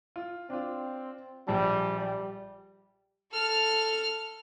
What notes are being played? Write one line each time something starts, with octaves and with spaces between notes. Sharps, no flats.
F4
C4 D4 F4
A#1 G3 G#4 A5
G3
A4 F6